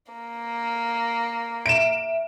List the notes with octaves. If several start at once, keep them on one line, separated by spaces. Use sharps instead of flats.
A#3
E5 D7 E7